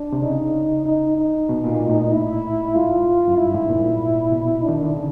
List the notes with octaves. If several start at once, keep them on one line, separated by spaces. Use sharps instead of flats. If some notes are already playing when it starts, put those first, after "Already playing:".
Already playing: D4
C3
C#3 D#4
D#4
D#4
B2
A#2
A2
E4
G#2 F4
F#2
G2 E4
G#2
A#2
B2
D#3 D4
D3
C#3